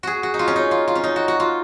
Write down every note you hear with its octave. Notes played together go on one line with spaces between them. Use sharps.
F#4 G#4
F#4
D#4
F4
C#4
D#4
F4
F4
C#4
D#4
F#4
F#4
F4